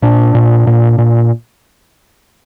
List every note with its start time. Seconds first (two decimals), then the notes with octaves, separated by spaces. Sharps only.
0.02 A#2 D4
0.35 A#2
0.67 A#2
0.98 A#2